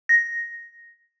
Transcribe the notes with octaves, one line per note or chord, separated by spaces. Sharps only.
A#6